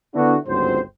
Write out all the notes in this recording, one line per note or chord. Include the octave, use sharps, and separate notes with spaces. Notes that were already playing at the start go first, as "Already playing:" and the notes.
D3 B3 D4 E4 F#4
G1 C#2 G#2 F#3 C4 C5